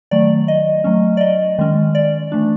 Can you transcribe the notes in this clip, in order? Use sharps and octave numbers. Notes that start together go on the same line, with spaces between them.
D#3 F#3 A3 D5
D#5
F#3 A3 C#4
D5
D#5
D#3 G#3 C#4
D5
E3 A3 D4